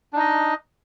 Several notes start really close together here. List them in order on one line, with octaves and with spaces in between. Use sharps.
D4 D#4 D#5